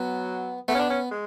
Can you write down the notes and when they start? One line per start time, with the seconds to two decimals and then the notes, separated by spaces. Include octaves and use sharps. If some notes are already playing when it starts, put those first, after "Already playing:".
Already playing: F#3 B3
0.68 A3 B3
0.74 C#4
0.79 D4
0.90 C#4
1.11 G#3